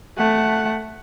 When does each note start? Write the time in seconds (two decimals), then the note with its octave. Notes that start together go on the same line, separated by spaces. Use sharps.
0.18 A3 F#5